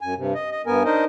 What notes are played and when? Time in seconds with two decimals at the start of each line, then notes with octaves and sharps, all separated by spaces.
0.01 F#2 G#5
0.17 G2 C3
0.34 D#5
0.52 D#5
0.66 G2 B3 A#4 G#5
0.85 D4 D#4 A#4 C5 D#5